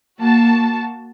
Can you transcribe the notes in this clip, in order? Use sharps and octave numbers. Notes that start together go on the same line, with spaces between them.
A#3 F#4 A5